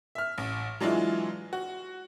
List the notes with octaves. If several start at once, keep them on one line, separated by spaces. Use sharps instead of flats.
E5 F6
A1
E3 F#3 G#3 D4 E4 F4
F#4